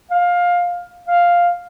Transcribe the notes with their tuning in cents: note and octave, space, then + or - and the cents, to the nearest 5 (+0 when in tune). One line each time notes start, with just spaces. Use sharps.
F5 +15
F5 +0